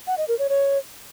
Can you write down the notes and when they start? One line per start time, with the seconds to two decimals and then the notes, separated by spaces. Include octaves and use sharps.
0.07 F#5
0.18 D#5
0.28 A#4
0.39 C#5
0.49 C#5